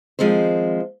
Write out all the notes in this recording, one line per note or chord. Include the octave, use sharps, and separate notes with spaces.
D#3 F3 G#3 C4 C5